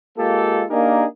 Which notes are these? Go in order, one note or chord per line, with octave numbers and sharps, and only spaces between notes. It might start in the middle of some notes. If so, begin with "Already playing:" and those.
G#3 A#3 F4 G4 A4
A#3 D4 D#4 G4 G#4 A#4